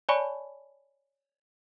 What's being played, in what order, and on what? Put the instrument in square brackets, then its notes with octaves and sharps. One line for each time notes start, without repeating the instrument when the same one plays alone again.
[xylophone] C#5 D5 G#5 A5 B5 C#6